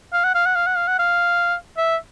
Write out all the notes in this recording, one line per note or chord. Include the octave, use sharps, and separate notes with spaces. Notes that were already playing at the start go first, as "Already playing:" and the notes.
F5
F#5
F5
F#5
F5
F#5
F5
F#5
F5
E5